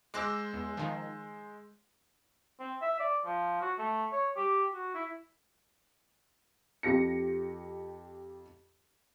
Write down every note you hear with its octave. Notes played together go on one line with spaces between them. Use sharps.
G#3 C5 D6 E6 F#6 A#6
E2
D#3 F3
C4
E5
D5
F3
F#4
A3
C#5
G4
F#4
E4
F2 G4 A#6 C#7